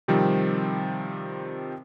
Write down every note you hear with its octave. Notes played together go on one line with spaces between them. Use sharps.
C3 D#3 F3 G3 C4